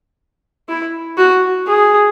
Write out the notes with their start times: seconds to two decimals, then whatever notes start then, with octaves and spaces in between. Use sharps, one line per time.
0.69 E4
1.17 F#4
1.67 G#4